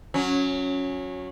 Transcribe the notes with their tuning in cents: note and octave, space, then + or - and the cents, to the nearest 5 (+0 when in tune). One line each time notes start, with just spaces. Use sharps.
F#3 -20 C#4 +0